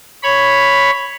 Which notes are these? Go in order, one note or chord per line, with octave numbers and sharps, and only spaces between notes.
C#5 B5